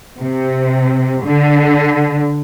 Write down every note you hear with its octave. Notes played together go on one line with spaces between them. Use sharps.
C3
D3